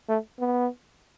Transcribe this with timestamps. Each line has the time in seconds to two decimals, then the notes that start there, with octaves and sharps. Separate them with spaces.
0.08 A3
0.39 B3